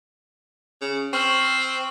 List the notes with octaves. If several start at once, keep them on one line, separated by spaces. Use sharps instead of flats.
C#3
C4 C#6 F6 F#7